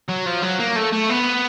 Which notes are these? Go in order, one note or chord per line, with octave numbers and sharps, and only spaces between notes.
F#3
F3
F#3
A#3
A3
A3
B3